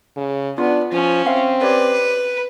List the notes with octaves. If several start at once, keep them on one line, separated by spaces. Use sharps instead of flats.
C#3
B3 D4 F4
F3 C#4
C4 E5 F5
G4 B4 C#5 D5